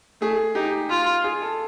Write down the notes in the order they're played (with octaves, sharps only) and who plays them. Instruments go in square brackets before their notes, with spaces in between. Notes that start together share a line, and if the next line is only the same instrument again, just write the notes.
[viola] A3 [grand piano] G#4
[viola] D#4 [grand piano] G4
[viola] F4
[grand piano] G#4
A4